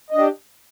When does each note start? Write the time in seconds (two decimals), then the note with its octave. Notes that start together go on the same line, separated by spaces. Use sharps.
0.10 D#5
0.14 D4
0.18 G4